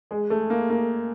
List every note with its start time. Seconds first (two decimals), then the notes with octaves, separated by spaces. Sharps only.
0.11 G#3
0.30 A3
0.50 A#3
0.70 A#3